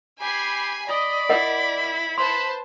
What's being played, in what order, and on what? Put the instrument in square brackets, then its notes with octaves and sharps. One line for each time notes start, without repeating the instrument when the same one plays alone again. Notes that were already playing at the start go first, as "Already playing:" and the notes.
[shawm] G4 [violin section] G#5 B5 C7
[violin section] D5 [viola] D#5 [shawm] B5
[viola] E4 [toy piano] A#4 D#5 F#5
[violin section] B4 C5 A5 [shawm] B5 [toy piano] C6